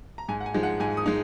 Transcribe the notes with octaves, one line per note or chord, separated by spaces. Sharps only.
A#5
G#2 G#5
F#5
G#5
F3 G#3 D#4
F#5
G#2 G#5
D#6
G#3 D#4